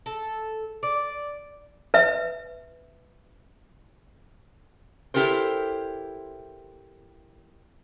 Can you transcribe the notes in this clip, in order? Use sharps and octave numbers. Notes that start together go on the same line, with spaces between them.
A4
D5
B4 E5
E4 G4 A4 A#4 C5